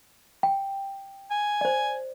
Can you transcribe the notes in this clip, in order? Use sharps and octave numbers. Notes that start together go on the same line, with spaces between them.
G5
G#5
C5 D5